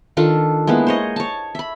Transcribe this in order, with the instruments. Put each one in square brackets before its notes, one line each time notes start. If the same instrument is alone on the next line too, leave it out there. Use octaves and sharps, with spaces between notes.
[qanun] D#3 D4 F4 A4
G#3 A#3 B3 E4
C5 C#5 D#5
C#5 A5
E5 B5